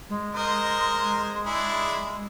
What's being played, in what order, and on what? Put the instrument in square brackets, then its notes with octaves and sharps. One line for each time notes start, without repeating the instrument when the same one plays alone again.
[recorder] G#3
[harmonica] A#4 C5 D#5
D4 E4 G#4